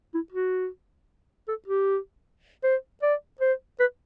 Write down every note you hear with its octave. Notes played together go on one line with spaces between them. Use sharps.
E4
F#4
A4
G4
C5
D5
C5
B4